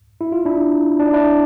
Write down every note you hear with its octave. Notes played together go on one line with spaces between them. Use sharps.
E4
F4
D4 E4
D4
D#4
D4 E4